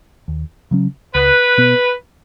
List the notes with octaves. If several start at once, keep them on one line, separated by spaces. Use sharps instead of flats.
D#2
C#3 F#3 C#4
C#2 B4
B2 B3